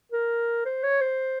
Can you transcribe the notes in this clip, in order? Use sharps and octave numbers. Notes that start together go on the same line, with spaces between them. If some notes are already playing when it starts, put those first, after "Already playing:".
A#4
C5
C#5
C5